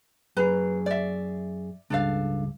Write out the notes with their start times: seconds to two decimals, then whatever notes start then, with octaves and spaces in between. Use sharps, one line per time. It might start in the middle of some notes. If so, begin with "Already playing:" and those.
0.37 F#2 G#4 B4 A#5
0.86 D5 E5
1.90 C#2 G2 D4 A4 F5